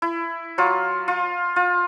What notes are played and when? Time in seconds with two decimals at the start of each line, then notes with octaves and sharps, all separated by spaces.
0.02 E4
0.58 F#3 F4
1.08 F4
1.56 F4